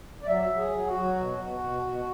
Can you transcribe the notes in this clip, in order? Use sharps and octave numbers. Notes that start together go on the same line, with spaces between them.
D5
F#3 E5
F#3
G#4
F#3
F#4
F#3
B2
B2
B2
B2